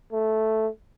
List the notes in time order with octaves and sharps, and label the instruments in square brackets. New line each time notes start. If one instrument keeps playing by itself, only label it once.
[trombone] A3